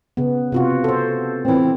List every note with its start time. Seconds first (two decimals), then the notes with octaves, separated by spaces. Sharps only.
0.17 C#3 B3
0.52 C3 F4 F#4
0.84 A4 C5
1.45 E3 C4